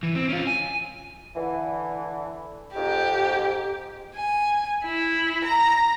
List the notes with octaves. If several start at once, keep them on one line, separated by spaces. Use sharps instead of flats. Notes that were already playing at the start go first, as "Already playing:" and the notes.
E3
C4
C#4 F4
G#5
D3 E3
F2 G#2 G4
G#5
E4
A#5